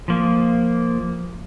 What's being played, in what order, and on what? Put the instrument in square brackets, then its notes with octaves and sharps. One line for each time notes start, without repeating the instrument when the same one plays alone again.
[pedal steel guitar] F3 A#3